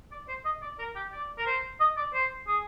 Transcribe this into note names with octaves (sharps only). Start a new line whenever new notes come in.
D5
C5
D#5
D5
A#4
G4
D5
A#4
C5
D#5
D5
C5
G#4